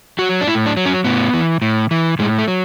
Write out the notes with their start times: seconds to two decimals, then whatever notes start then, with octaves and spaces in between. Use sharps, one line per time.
0.19 F#3 F#4
0.41 D4
0.47 A2 E4
0.66 D4
0.77 F#3
0.86 C#4
1.04 A2 B3
1.34 E3
1.62 A2
1.91 E3
2.19 A2 G#3
2.39 A3
2.48 F#3